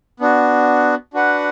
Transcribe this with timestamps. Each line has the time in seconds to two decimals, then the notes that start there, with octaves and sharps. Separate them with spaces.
0.20 B3 D4 F#4
1.13 D4 F#4 B4 F#5